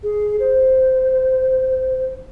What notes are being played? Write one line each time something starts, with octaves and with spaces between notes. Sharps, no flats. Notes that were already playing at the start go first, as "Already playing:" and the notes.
G#4
C5